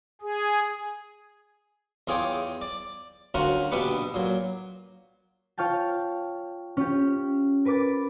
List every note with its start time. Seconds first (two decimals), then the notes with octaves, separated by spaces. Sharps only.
0.22 G#4
2.07 E2 F4 G#4 C#5 G5 D6
2.62 D5
3.34 D2 C#4 F4 F#4 A#4 F#5
3.72 A#1 B2 D4 G4 B4 C#6
4.14 A#2 F#3
5.58 F4 C#5 F5 G5 A5
6.77 C#4 F4 G4
7.65 A#4 B4 B5 D6 A6